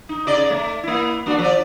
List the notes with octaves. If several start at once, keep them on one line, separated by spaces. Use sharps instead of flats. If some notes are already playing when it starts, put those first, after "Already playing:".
D#4
C#3 D5 D#5
A3
A#3 E4
A#3 D4 F#4
F3 D5